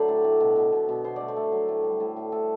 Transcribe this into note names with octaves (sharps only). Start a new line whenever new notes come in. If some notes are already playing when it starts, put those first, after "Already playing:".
Already playing: D3 F#3 A3 E4 A4 C5 D5
A2
A2
B2
B2
B2
B2
B2 C5
A3 D5
C5
A3
F#3
A2
G3
A2
A2
A2 A4